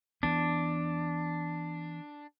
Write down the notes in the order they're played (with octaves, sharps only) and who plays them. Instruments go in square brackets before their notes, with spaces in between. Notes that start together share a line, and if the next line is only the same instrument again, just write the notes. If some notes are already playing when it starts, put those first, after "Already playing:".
[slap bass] E3 B3 [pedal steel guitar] D4